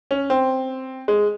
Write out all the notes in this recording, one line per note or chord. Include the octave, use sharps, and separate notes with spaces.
C#4
C4
G#3